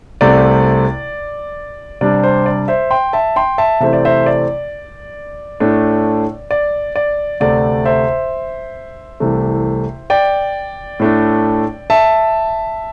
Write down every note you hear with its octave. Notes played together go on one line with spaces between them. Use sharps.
C2 C3 A3 C4 D5
C3 G3 D4 D5
C5
D5
C5 E5
G5 C6
E5 A5
G5 C6
E5 A5
C3 E3 A3 C4 E5
D5
C5 E5
D5
A2 A3 D4
D5
D5
D2 C3 A3 D5
C5 E5
C2 C3 E3 A3
D5 G5
A2 A3 D4
E5 A5